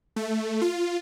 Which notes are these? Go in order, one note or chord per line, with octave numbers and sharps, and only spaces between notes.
A3
F4